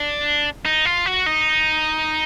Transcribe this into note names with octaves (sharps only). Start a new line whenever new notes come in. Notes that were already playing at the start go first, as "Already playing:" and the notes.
Already playing: D4
D#4
F4
F#4
D#4